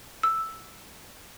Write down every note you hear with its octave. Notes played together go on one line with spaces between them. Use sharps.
E6